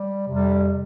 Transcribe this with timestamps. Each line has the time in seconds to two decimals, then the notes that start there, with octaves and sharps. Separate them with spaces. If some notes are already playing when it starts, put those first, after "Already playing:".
Already playing: G3
0.26 F2 C3 G3